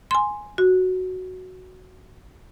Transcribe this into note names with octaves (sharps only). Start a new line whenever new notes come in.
G#5 C6
F#4